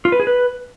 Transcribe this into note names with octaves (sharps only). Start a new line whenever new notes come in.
F4
B4
G#4
B4